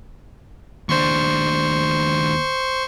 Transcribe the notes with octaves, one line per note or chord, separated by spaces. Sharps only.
D#2 D4 C5 C6 C#6